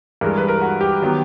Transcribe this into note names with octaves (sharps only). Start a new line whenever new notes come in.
G2 E3 G#3 A#4
B4
A#4
F#4
G4
D#3 F#3 B3